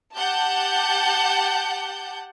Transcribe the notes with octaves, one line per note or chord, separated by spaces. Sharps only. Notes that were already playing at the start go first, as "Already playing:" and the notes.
G4 F#5 A5 G6